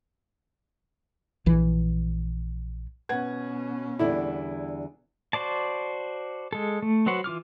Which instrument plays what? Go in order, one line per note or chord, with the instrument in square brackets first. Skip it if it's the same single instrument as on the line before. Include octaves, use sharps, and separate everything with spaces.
[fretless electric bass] A#1 E3
[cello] B2 C#4 [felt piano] B4 F#5 G#6
[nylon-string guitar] E2 D3 G3 [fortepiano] E4
[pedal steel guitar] F#4 C5 D5 A5
G#3 A4
A3
F#3 F#4 B4 C5 F#5
E3 F4 D6 F6